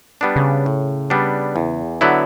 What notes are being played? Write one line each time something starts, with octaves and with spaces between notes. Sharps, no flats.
G3 B3 D4
C#3
A2
G3 B3 D4
E2
D3 F#3 B3 E4